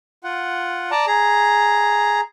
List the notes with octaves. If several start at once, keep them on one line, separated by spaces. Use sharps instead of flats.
F4 F#5
D5 A5 A#5
G#4 A#5